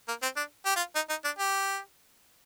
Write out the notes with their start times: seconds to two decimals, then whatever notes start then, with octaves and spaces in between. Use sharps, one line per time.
0.08 A#3
0.22 C4
0.37 D4
0.65 G4
0.76 F4
0.95 D#4
1.09 D#4
1.25 D4
1.39 G4